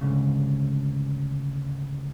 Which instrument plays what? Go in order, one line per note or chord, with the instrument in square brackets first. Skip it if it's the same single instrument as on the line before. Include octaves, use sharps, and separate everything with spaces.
[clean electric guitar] D2 G#2 C#3